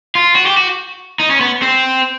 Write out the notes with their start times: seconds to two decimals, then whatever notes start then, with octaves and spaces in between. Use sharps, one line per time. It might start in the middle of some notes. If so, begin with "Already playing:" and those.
0.15 F4
0.36 F#4
0.46 G4
0.57 F#4
1.20 D#4
1.30 C#4
1.41 B3
1.62 C4